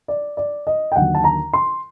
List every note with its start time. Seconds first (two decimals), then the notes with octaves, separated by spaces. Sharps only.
0.08 D5
0.37 D5
0.67 D#5
0.92 G5
0.96 D#2 D3 F#3 F#5
1.15 A5
1.24 A#5
1.53 C6